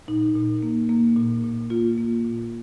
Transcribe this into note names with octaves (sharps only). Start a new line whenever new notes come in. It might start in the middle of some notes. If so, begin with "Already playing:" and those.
A#2 D#4
A#2
A#3
A#3
A#2
A#2
A#3 F4
A#3
A#2